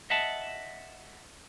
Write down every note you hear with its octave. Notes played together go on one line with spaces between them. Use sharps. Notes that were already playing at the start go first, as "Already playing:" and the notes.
D#5 E5 F#5 A5